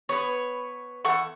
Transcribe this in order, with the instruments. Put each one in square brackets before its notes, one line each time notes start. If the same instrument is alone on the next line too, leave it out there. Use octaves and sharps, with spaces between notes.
[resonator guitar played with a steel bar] B3 B4 [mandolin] C#5
[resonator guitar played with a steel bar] E2 A4 F#5 [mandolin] C#6